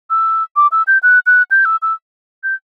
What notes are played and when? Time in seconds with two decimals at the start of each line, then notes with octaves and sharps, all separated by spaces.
0.10 E6
0.56 D6
0.72 E6
0.87 G6
1.03 F#6
1.26 F#6
1.51 G6
1.65 E6
1.82 E6
2.44 G6